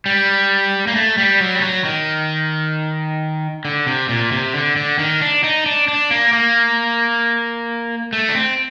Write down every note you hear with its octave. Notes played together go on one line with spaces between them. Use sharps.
G3
A#3
A3
G3
F#3
G3
F#3
D#3
D3
C3
A#2
C3
D3
D3
D#3
D4
D#4
D4
D4
A#3
A#3
A3
D4
C4